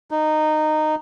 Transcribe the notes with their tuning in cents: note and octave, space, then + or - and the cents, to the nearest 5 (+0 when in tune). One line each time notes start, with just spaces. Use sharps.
D#4 -15